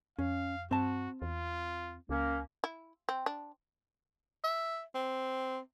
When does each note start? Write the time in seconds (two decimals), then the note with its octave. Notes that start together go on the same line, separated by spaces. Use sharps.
0.19 F2 C#4 F5
0.71 G2 C4 F#4 A5
1.22 E2 F4
2.09 C#2 A#3 C#4
2.64 E4
3.09 C4
3.26 D4
4.44 E5
4.95 C4